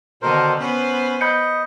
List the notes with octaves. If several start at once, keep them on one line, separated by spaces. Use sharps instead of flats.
B2 D3 D#3 A4 A#4 C5
B3 C#4 B4 C5
D#5 B5 G6 C#7